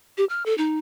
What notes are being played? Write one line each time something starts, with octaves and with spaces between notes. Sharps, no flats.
G4
F6
A4
D#4